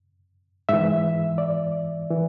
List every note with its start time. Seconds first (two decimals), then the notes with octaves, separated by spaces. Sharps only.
0.69 G#2 E3 E5
1.38 D5
2.11 E3